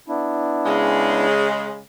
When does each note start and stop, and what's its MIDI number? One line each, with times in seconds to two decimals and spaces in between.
0.08 1.27 59
0.08 1.27 62
0.08 1.27 64
0.65 1.78 49
0.65 1.78 56